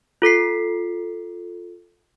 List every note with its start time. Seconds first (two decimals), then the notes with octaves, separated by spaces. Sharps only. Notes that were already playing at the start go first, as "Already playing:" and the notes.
0.22 F4 A4 B6 C7